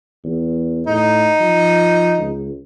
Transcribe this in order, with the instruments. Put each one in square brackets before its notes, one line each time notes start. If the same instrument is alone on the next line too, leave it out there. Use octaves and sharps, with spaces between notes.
[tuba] E2
[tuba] A2 [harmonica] D#4
[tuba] F3
C#2